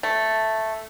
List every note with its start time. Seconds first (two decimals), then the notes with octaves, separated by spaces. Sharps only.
0.03 A3